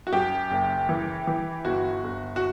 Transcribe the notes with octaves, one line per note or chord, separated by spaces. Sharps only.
F#4
F#2 G4
F#1
E3
E3
G1 F#4
G1
F#4